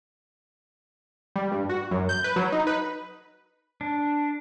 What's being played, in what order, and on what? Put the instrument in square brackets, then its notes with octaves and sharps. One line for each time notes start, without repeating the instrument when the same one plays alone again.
[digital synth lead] G3
G2
F#4
F#2
G6
B4
F#3
D#4
B4
[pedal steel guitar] D4